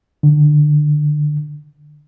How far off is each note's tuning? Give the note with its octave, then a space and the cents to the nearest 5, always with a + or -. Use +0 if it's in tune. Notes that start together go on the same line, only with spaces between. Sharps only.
D3 +20